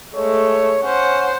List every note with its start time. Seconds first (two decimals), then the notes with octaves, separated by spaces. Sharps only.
0.14 G#3 A3 C#5
0.83 C#4 C5 F#5